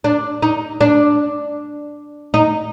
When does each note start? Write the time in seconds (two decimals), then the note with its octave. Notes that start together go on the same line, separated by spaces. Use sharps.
0.04 D4
0.42 D#4
0.81 D4
2.34 D#4